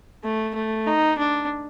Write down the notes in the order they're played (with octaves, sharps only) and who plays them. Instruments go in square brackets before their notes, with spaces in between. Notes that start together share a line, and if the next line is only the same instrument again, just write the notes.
[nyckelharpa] A3
A3
D#4
D4